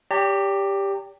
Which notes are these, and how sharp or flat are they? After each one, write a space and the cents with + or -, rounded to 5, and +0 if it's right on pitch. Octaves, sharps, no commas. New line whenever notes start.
G4 +10 D5 -45 A#5 -40